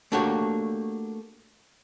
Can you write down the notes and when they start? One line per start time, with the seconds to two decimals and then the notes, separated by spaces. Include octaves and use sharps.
0.12 A3 A#3 D4 F#4 G4 C#5